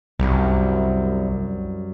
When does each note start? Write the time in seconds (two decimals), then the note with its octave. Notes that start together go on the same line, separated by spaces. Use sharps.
0.19 C2 F#2 G3